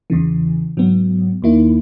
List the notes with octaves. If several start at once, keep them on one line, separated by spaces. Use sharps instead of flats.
E2 C#3 E3
G#2 F#3 B3
D#2 D#3 A#3 E4